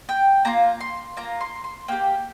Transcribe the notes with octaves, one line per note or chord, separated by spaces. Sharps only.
G5
A#3 F4 A#5
C6
A#3 F4 A#5
C6
C6
A#3 G4 G5